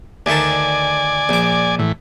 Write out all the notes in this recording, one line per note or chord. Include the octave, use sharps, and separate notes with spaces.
D2 D#3 D5 G#5 A5
A#1 D6
A2 E3